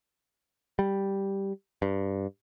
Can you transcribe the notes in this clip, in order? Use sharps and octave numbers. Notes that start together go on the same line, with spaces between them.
G3
G2